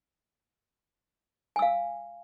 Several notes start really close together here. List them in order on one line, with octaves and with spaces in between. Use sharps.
G#5 E6 F5